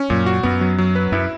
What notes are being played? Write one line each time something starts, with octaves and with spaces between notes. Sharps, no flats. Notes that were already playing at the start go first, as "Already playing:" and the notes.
Already playing: C#4
F#2 A#2
F#4
F#2 B3
F#3
F#3
B4
F#2 E4